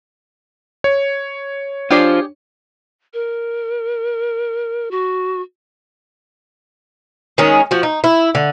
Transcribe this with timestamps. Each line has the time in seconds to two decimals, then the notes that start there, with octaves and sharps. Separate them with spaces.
0.84 C#5
1.91 D4 F4 G4 G#4 C5 D5
3.14 A#4
4.91 F#4
7.38 D#3 G#3 C#4 G#4
7.71 F3 F#4
7.83 D#4
8.04 E4
8.35 D3